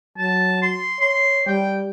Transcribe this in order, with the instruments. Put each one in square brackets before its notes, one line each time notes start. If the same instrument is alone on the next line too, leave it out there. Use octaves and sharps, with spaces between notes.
[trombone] F#3 [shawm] A5
[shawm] C6
[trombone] C#5 [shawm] C6
[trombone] G3 [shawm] G5